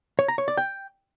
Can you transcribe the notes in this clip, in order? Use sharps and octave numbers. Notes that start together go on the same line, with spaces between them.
C#5
A#5
C#5
D5
G5